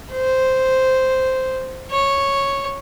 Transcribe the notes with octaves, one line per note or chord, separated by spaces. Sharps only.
C5
C#5